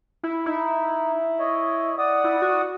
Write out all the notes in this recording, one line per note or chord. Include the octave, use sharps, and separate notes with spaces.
E4
D#4 E4
C#5 D#5
D5 F#5 D#6
E4
F#4